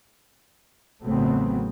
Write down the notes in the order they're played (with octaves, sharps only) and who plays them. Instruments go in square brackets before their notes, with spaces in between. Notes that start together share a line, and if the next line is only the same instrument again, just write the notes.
[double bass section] A1 C#3 F#3 A3 B3 C4